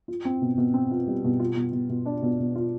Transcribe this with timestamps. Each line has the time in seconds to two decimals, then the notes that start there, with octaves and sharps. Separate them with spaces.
0.08 F4
0.25 C4
0.42 B2
0.58 B2
0.74 C4
0.91 F4
1.07 G3
1.24 B2
1.40 F4
1.57 B2
1.72 B2
1.89 B2
2.06 D4
2.23 B2
2.40 B2
2.56 F4